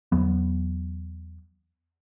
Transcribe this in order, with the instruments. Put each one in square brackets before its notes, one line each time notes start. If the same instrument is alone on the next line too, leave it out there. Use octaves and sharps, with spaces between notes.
[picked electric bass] E2 F#3 B3